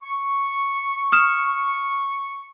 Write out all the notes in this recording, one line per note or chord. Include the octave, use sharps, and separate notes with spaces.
C#6
D#6 F6 E7